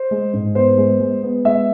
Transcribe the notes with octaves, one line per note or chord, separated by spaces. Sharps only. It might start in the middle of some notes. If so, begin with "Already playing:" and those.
Already playing: C5
G#3
G#2
B3 C5
G#3
G#3
B3
G#3 E5